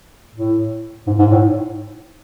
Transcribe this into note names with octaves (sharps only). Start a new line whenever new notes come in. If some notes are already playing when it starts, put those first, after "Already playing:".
A2
G#2
G#2
A2